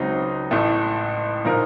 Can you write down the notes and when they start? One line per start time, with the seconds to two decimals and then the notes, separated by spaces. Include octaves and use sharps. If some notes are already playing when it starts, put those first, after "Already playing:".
Already playing: C#2 C#3 F#3 C4 D#4
0.51 A1 A2 A3
1.45 A#2 F3 A#3 D#4 A#4